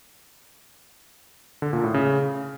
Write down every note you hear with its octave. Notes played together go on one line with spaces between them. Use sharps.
D3
A#2
A2
C#3